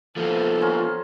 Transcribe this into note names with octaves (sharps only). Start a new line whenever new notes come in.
F3 A#3 B3 A4 C5
C#4 F4 A#4